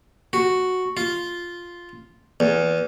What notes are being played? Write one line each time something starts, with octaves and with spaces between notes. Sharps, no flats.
F#4
F4
E2